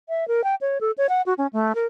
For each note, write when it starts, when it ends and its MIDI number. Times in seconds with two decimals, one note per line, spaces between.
0.09 0.27 76
0.28 0.44 70
0.44 0.55 79
0.61 0.78 73
0.81 0.91 69
0.98 1.07 73
1.09 1.22 78
1.26 1.34 66
1.38 1.47 61
1.53 1.75 57
1.75 1.86 70